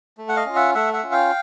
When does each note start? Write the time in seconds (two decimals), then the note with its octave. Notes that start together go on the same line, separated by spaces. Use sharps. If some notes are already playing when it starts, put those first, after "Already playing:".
0.17 A3
0.29 F#5
0.36 D#5 F5
0.46 C#4 F4
0.55 E5 F#5
0.75 A3 E5 F#5
0.93 E5 F#5
1.03 C#4 F4
1.12 F5 G5